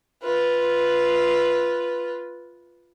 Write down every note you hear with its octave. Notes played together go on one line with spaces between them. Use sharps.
F4 B4